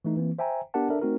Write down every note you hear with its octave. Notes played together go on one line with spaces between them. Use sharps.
E3 A3 D#4
E3 A#3 C4
C5 E5 G5 G#5 A#5
B3 D4 G4 A#4 F#5 A5
D4 A4 A#4 E5
A3 C4 D#4 F#4 A#4